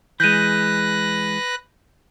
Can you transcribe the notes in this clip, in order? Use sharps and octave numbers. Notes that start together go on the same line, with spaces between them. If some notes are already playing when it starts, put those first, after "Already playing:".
E3 G#3 B4 F#6 G6 A#6 D#7